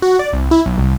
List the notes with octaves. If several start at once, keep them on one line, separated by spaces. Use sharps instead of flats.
F#4
D5
C2
E4
B1
C2